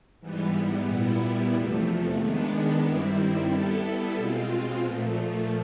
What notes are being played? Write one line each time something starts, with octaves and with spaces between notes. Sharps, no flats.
G#2 E3 G3 B3
A#2 G3 B3 E4
E2 C3 F3 A3
D#3 G#3 B3 D4
G2 D#3 G3 C4 E4
G3 B3 E4 A4
B2 G#3 C4 F4
A#2 F3 A3